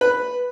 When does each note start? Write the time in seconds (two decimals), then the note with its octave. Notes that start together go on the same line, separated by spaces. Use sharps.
0.01 B4